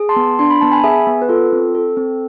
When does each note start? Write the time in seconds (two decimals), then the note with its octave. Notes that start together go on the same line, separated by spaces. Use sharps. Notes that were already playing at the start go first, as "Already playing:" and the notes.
Already playing: G#4
0.09 A5 C6
0.16 B3
0.39 D4 C6
0.50 B5
0.61 B3 A5
0.72 G#5 B5
0.84 G#4 E5 G#5
1.07 B3
1.22 B4
1.29 F4 A4
1.53 C4
1.75 A4
1.97 C4